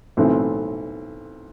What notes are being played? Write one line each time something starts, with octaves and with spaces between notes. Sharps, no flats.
B1 A2 E3 A3 C4